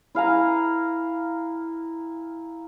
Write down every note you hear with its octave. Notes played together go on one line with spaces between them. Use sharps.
E4 F5 G#5 A#5